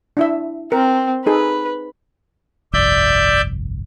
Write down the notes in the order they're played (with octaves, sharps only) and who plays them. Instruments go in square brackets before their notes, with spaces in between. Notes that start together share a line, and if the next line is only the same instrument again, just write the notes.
[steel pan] D4 E4 E5
[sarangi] C4 [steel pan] A#4
[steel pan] D#4 G#4 A4 [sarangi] B4
[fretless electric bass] G1 C2 F2 [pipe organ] D5 E5 G6